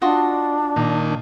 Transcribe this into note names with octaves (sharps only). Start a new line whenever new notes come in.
D4 F4 F#4 D#5
A#2 D#3